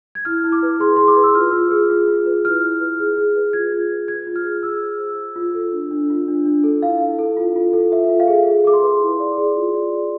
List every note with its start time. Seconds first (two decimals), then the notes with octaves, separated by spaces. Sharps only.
0.15 G#6
0.25 E4 F6
0.44 E4
0.52 D6
0.63 B4
0.80 G#4 C6
0.96 G#4 C6
1.08 D6
1.16 B4
1.23 E6
1.35 F4 F6
1.53 F4
1.71 G#4
1.89 F4
2.08 F4
2.26 B4
2.45 E4 F6
2.63 E4
2.81 B4
2.99 G#4
3.17 G#4
3.36 B4
3.53 F4 G#6
3.72 F4
3.91 B4
4.08 F4 G#6
4.27 F4
4.36 F6
4.45 G#4
4.63 G#4 E6
4.82 C5
4.99 C5
5.18 F4
5.36 F4
5.55 A4
5.72 D4
5.91 D4
6.10 F4
6.28 D4
6.45 D4
6.64 A4
6.82 E4 F5
7.01 E4
7.19 A4
7.37 F4
7.56 F4
7.73 A4
7.92 F4 E5
8.09 F4
8.20 F5
8.28 G#4
8.47 G#4
8.64 G#4 D6
8.73 C6
8.82 B4
9.01 E4
9.20 D5
9.37 G#4
9.56 F4
9.74 D5
9.93 G#4